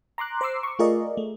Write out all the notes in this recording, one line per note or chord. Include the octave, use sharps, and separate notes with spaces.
A#5 C6 D6 F#6
C5 A#5 C6 D6 E6 C7
C#6 D6
A3 F4 G#4 A#4 D5 D#5
A3